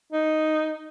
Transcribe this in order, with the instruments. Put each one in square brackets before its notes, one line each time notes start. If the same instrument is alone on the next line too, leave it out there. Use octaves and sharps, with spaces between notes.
[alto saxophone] D#4